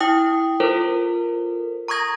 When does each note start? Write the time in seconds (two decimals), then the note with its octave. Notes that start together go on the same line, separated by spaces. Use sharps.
0.01 E4 G5 D#6
0.60 F4 A4 A#4 C5
1.88 A#5 C#6 D#6 G#6 A#6